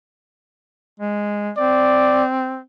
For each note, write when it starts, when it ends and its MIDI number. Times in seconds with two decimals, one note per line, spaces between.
1.00 1.51 56
1.58 2.61 60
1.58 2.24 74